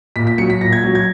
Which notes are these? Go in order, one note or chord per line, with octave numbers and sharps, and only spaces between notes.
A#2 B6
B6
F#3 C#7
B6
A#2 A#6
G#6
F#3
G#6